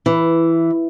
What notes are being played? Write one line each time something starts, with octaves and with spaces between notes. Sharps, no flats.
E3